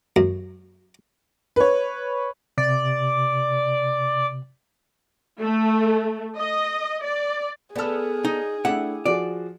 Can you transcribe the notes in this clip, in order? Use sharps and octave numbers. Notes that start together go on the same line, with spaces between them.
F#2
B4 C#5
C3 D5
A3
D#5
D5
B3 G#4 A4 D5 A5 F6
D#4
A3 D4 E4 G4 F#5
F3 F#4 G#4 D5